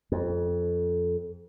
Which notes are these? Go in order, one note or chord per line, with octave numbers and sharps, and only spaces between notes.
F2